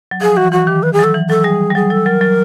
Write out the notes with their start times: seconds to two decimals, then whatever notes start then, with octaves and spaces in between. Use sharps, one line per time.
0.11 F#3
0.21 F3 G#4
0.37 E3 F#4
0.52 E3 F#4
0.67 D#3 G4
0.83 B4
0.93 G#4
0.99 F#3
1.04 A4
1.14 E3
1.30 F#3 A4
1.44 G3 G#4
1.70 G3
1.75 F#3 G#4
1.90 F#3 A4
2.06 F#3 A#4
2.21 F#3